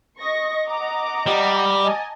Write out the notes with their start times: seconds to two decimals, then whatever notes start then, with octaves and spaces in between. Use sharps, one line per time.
0.20 D#5 C#6 A#6
0.68 F#5 A#5 D6
1.26 G3
1.82 D#5 G#5 A5